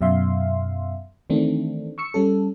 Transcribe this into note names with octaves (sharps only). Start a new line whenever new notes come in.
F#2 B2 E5 F5 C6
D#3 E3 A3 C4 D4
C#6 E6 C#7
G3 C#4 A4